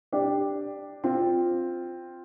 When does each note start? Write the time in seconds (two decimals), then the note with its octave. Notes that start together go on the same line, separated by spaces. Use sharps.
0.13 D4 G4
1.04 C4 F4